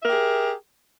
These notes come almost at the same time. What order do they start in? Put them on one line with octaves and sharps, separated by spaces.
E5 A#4 G4 G#4